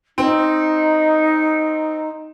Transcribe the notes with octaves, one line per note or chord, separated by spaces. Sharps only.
C4 D#4